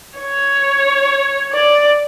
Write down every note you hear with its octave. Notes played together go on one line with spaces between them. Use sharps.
C#5
D5